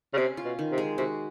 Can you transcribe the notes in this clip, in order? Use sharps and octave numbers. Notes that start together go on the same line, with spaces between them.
C#3
C3 C#4
F4
B2
D#3
C3
G#3
C3 F#4